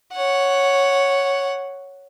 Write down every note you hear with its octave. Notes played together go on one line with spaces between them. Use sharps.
C#5 F#5